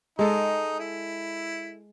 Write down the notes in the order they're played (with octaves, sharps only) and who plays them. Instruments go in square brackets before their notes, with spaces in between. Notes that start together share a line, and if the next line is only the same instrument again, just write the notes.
[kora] G#3 A4 [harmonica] D#4
[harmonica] E4